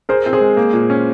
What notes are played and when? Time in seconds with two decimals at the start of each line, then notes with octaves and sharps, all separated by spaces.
0.09 G#4 A#4 C5
0.26 C4
0.33 G#4 C5
0.41 G#3
0.57 A#3
0.73 A#2
0.90 C#4